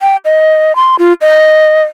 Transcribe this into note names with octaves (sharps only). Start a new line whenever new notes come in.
G5
D#5
C6
F4
D#5